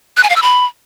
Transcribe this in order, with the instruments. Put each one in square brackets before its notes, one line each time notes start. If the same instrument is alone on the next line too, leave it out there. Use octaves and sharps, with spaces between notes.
[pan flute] F#6
G#5
F5
E6
B5